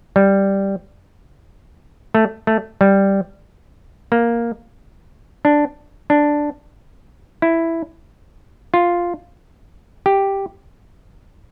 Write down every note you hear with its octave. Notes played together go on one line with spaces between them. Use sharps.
G3
A3
A3
G3
A#3
D4
D4
E4
F4
G4